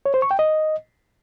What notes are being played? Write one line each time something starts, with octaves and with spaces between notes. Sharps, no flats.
C#5
C5
C#6
G5
D#5